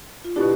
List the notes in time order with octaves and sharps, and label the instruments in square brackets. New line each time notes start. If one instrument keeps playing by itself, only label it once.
[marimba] F4
[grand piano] B2 B3 D4 [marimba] E4 G4